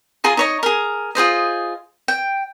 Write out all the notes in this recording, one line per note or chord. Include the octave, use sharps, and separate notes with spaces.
F4 G#4 A#5 C6
D#4 C#5 D#5
G#4 A#4
F4 G#4 C5 D#5
G5